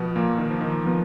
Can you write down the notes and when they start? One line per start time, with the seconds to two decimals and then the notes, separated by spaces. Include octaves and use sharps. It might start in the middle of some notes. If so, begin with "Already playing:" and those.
Already playing: B2 F3 B3
0.16 A#2 A#3
0.38 D#3
0.50 F3
0.61 D#3
0.85 F3 B3